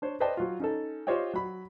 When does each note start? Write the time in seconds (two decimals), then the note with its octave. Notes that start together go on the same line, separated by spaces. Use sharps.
0.02 D4 C5 C#5
0.20 B4 C5 D5 D#5 G5 A5
0.37 F#3 F4
0.60 C#4 D#4 A4
1.07 F4 G4 C5 C#5 D#5 G5
1.33 F#3 B5